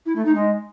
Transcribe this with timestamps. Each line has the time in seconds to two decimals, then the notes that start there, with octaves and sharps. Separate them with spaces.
0.05 E4
0.15 A3
0.25 D#4
0.35 G#3